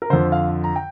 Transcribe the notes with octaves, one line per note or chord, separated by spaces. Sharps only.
A#4
F2 D3 C5
F5
A#5
G5